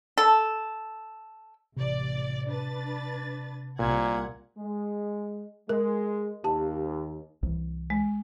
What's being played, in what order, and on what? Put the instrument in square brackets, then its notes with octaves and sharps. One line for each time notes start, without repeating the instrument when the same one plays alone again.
[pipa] A4
[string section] A1 D5 [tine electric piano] C3
[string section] D4 B4 A6
[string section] C2 F#5 G#6 [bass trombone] A#2
[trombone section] G#3
[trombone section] G#3 [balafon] A#4
[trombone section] D#2 [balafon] G4 A5
[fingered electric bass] C2 E3
[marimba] G#3